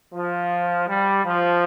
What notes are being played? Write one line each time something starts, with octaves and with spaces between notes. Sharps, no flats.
F3
G3
F3